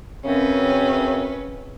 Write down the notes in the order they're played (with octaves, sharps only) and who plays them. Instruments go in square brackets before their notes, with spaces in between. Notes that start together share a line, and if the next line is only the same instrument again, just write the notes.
[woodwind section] F#2 C#3 C4 [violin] C#4 B4